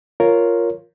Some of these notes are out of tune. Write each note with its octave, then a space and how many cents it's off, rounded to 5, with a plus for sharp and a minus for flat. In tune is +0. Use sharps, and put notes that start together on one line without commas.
F4 +0 A#4 +0 C#5 +0